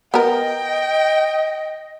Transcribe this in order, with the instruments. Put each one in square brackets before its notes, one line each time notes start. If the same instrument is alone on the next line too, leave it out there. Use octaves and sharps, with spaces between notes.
[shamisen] B3 A#4 [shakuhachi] D#5 [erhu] G5